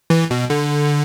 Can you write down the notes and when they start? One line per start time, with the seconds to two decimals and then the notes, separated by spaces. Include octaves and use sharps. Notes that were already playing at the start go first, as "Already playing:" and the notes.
0.10 E3
0.31 B2
0.50 D3